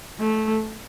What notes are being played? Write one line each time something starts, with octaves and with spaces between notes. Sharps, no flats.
A3